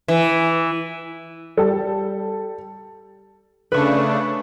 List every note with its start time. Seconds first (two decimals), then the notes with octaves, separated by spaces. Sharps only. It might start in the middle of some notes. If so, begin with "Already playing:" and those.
0.08 E3
1.57 G3 A4
3.72 C#3 A3 D4 B4 C#6